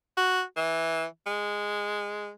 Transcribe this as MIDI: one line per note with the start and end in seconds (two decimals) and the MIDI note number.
0.17 0.43 66
0.56 1.06 52
1.26 2.31 56